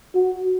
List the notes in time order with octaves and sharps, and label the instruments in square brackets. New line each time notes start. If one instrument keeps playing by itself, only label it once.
[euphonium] F#4